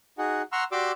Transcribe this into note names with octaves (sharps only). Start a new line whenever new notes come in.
D#4 F#4 G#4 F#5
F#5 A#5 C6 C#6 E6 F6
F#4 G4 D5 C6 D6 E6